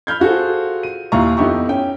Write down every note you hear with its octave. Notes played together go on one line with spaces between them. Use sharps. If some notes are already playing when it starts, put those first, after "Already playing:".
B5 F6 G6 G#6
F4 F#4 G#4 A4 C5
D#7
D#2 A#2 E4 F4 A#5 C#6
F2 B3 D#4 E4 G4 C#6
C#4 G5